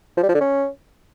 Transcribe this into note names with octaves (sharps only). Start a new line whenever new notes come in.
F3
G3
F3
D3
C#4